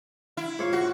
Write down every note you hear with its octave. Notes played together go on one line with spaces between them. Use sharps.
E4
G#2 F4 C#5 F5
F#4